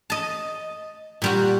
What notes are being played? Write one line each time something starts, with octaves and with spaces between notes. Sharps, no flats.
D#5 A5
A#2 G3 F#4